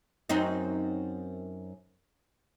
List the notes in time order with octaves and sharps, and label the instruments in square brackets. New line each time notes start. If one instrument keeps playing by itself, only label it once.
[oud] F#2 C4 D#4